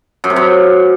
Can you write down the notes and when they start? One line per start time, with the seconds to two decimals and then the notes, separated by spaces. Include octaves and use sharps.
0.24 F#2
0.30 C3
0.36 F#2